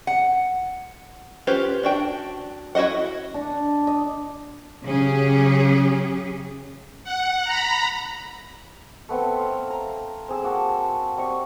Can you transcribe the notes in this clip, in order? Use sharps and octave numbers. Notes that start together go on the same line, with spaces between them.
F#5
C#4 F4 G4 B4 C5
D4 F#4 G5
E4 F#4 C5 D#5 F#5
D4
D#5
C#3 F#3 C#4 G4 G#4
F#5
A#5 B5
A3 B3 C4 G5
C5 F5
A#5
C4 G#4 E6
A#3 F#4 A5
G3 C4 D#5 C#6